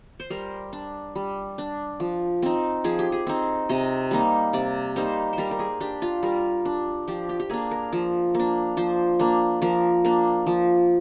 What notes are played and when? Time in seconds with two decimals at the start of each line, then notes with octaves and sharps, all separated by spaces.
0.20 C5
0.30 G3 A#4
0.73 D4
1.15 G3
1.58 D4
2.00 F3
2.42 C4 D#4
2.84 F3 G#4
2.99 G4
3.12 G#4
3.27 C4 D#4
3.69 C3 D#5
4.11 G3 A#3 D#4
4.53 C3 D5
4.96 G3 A#3 D#4 C5
5.33 C5
5.38 G3 A#4
5.51 A#4
5.59 G#4
5.80 D4 G4
6.02 F4
6.23 G3 A#4
6.65 D4
7.08 F3 G4
7.29 G4
7.40 G4
7.50 A#3 D4 G#4
7.71 A#4
7.93 F3
8.35 A#3 D4
8.77 F3 C5
9.19 A#3 D4
9.62 F3 A#4
10.05 A#3 D4
10.47 F3